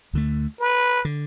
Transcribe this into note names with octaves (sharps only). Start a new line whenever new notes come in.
D2 D3 A3
B4
D3